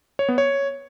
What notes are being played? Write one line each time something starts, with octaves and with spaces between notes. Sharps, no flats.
C#5
B3
C#5